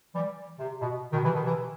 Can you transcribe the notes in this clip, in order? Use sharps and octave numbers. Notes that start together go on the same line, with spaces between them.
E3 G3
C3
B2
B2 D#3
C3 E3
B2 D#3
C3 E3